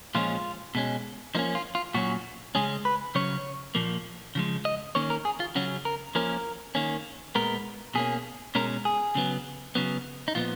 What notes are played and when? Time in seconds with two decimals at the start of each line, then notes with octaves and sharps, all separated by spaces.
0.15 A#2 F3 G#3 C#4 F4
0.75 B2 G#3 C#4
1.35 F3 A#3 C#4 D#4
1.55 F4
1.75 F4
1.94 A#2 F#3 C#4 F#4
2.55 C#3 G#3 C#4 G#4
2.85 B4
3.15 C#3 F#3 C#4 C#5
3.75 A#2 F3 A#3
4.35 C#3 F3 G#3
4.65 D#5
4.95 D#3 A#3 C#4 C#5
5.10 A#4
5.25 G#4
5.40 F4
5.55 C#3 F#3 C#4 F#4
5.85 A#4
6.15 F3 A#3 C#4 A#4
6.75 D#3 A#3 C#4
7.35 A#2 G#3 B3 A#4
7.95 B2 A#3 C#4 G#4
8.55 B2 G#3 C#4 A#4
8.85 G#4
9.15 C#3 F#3 B3
9.75 C#3 F#3 B3
10.28 D#4
10.35 A#2 F3 B3 F4